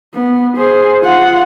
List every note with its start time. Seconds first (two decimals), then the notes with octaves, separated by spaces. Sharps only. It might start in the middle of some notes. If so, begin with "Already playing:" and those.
0.15 B3
0.57 G#4 C5
1.03 F4 F#5